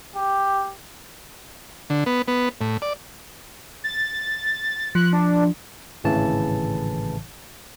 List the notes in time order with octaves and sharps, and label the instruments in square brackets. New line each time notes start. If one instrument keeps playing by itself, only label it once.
[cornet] G4
[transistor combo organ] D3
B3
B3
A2
D5
[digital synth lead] A6
[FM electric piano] F3 [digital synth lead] F#6
[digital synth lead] D4
[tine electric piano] G#1 A2 C#3 E3 A5